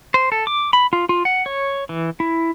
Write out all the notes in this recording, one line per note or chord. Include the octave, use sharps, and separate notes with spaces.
C5
A4
D6
B5
F4
F4
F#5
C#5
E3
E4